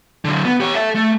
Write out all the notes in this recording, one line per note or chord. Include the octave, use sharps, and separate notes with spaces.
D3 F#3
B3
G4 C#5
A4 E5
A3